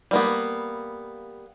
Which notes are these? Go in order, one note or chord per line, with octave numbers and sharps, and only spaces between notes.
G3 A#3 B3